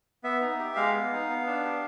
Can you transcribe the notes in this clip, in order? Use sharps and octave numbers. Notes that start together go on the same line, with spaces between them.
B3 E5
D#4
G4
G#3 F5
B3
D#4
B3
D4
G4